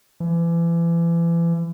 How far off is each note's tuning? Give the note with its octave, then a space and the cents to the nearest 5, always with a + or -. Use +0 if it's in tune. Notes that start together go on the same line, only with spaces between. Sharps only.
E3 +35